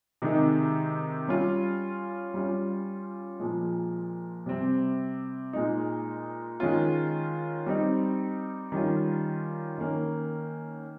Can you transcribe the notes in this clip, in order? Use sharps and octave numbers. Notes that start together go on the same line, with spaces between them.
C3 D#3 G#3 D#4
G3 C#4 F4
G3 C#4 F4
A#2 F3 G#3
C3 G3 C4
A#2 G#3 D#4
D#3 G#3 C#4 F4
G3 C4 D#4
D#3 G3 C#4 F4
D#3 A#3 C#4